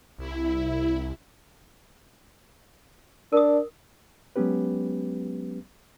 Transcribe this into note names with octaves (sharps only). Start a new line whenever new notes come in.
C2 E4
D4 A#4 D#6
F#3 G#3 B3 C#4 G4 B4